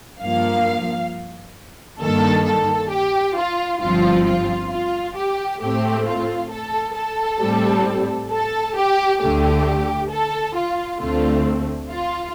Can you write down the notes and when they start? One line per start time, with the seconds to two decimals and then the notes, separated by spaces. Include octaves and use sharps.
0.21 G2 F3 A#3 F5
2.01 G2 D#3 A#3 A4
2.46 A4
2.91 G4
3.36 F4
3.81 G1 G2 F3 C4 F4
4.25 F4
4.71 F4
5.16 G4
5.61 A2 A3 C4 G4
6.06 F4
6.51 A4
6.96 A4
7.41 A2 G3 C4
8.31 A4
8.76 G4
9.20 D2 D3 A3 G4
10.10 A4
10.56 F4
11.01 D2 D3 A3 C4 F4
11.90 F4